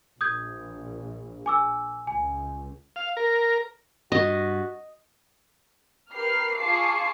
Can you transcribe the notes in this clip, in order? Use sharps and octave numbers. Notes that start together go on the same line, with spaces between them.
A#1 D#6 G6 G#6
G#5 D6 E6
C#2 G#5
F5
A#4
G2 F#4 D#5
G4 A#4 B4 F6 C7
F4 G#4 A5 C#6 D6 C7